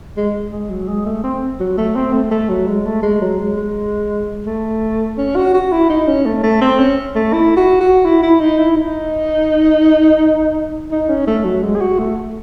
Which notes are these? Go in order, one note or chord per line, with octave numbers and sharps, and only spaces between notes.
G#3
G#3
F#3
G#3
A3
C4
F#3
A3
C4
A3
A3
F#3
G#3
A3
G#3
F#3
G#3
G#3
A3
C#4
F#4
F#4
E4
D#4
C#4
A3
A3
C4
C#4
A3
E4
F#4
F#4
E4
E4
D#4
E4
D#4
D#4
C#4
A3
F#3
G#3
G#4
F#4
A3